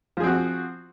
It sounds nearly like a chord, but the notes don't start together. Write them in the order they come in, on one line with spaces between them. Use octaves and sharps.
F3 G#4 C4 F#4